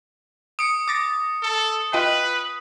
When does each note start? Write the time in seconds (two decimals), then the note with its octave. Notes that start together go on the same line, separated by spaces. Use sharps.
0.59 D#6 C#7 D7
0.88 D6 A6 A#6
1.43 A4
1.93 F4 B4 D#5 G5